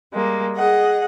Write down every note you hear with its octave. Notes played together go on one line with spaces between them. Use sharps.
G3 G#3 A#3
G#4 D#5 F#5